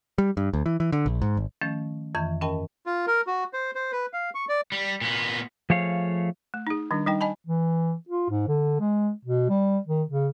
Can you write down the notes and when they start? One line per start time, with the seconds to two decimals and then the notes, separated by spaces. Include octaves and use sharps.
0.18 G3
0.37 G2
0.53 D2
0.66 E3
0.80 E3
0.92 D3
1.06 A#1
1.22 G#2
1.37 G#1
1.61 D#3 F3 A3 C#4
2.15 F2 D#3 E3 E5 C#6
2.41 G2 C#4 A#4 D#5 G5 A5
2.86 F4
3.07 A#4
3.27 F#4
3.53 C5
3.75 C5
3.92 B4
4.13 F5
4.35 C#6
4.49 D5
4.72 G3
5.01 A#2 B3
5.70 F3 A3 G#4 C#5 F5
6.54 A3
6.67 D#4 G#4
6.91 D#3 G3 D4
7.06 G3 D#4 G5
7.21 D#5 G#5 A5 B5
7.46 E3
8.09 F4
8.30 G#2
8.48 D3
8.80 G#3
9.25 B2
9.49 G3
9.87 D#3
10.10 C#3